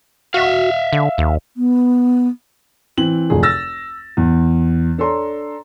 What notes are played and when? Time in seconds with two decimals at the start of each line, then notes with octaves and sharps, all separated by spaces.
0.34 F#4 E5 F5
0.93 D3
1.18 D#2
1.57 B3
2.97 E3 C4 F#7
3.30 F1 D2 F3 G#4
3.43 E6 A6 A#6
4.17 E2
4.98 D4 A4 C#5 A#5 C6